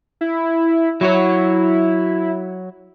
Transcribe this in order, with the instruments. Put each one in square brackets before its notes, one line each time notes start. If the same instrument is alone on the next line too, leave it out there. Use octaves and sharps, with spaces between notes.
[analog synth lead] E4
[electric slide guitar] F#3 F#4 C#5 [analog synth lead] E4